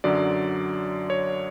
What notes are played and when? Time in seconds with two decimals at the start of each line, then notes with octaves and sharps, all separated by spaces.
0.04 F#2 D3 F#3 D5
1.10 C#5